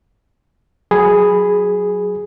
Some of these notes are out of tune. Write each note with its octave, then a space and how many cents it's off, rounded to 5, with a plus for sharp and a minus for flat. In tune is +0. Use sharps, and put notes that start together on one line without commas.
F#3 +0 G#4 +0 B5 +0